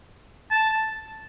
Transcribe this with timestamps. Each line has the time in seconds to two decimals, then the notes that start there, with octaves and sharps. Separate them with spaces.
0.51 A5